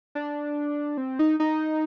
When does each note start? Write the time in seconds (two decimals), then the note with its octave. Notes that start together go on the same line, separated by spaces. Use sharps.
0.15 D4
0.97 C4
1.19 D#4
1.40 D#4